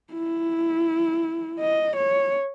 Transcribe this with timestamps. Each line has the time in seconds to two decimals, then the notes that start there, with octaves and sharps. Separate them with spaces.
0.13 E4
1.60 D#5
1.96 C#5